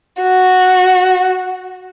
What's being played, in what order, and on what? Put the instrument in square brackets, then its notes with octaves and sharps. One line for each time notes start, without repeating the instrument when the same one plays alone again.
[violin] F#4